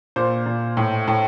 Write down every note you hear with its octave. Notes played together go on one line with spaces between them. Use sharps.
A#2 C5
A#2
A2
A2